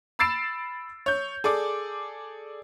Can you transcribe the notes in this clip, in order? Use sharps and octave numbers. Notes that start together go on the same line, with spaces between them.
B5 E6 A6 C7 D7 E7
C#5 G6
G#4 A4 D5 D6